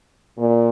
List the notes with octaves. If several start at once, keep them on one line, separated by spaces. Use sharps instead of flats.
A#2